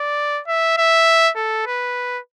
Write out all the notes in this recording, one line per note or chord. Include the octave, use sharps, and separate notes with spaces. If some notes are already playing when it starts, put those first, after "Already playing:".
Already playing: D5
E5
E5
A4
B4